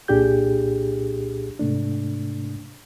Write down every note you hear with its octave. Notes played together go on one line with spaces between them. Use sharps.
C2 A#2 D4 G4 G#4 G6
G#2 C3 A3 D4